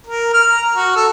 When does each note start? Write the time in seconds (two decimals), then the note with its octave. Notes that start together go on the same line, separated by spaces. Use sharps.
0.07 A#4
0.34 F6
0.52 A#5
0.75 F#4
0.96 A4